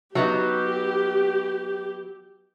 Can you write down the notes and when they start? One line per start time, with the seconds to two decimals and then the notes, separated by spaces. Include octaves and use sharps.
0.15 F#3 B3 D#4 G4